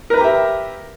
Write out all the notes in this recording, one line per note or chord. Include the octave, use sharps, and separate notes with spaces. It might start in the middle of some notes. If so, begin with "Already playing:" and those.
G4 A#4 B4 E5 A#5